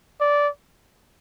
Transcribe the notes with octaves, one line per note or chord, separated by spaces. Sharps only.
D5